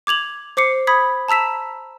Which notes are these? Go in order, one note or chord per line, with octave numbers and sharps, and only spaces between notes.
D6 G#6 F7 F#7
C5 D6 C7 C#7
B5 D#6 G#6 B6
A5 A#5 E6 B6 E7